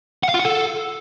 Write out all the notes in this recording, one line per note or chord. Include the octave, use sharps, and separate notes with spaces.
F#5
F5
F4
F#5
A4